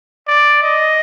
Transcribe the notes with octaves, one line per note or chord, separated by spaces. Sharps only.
D5
D#5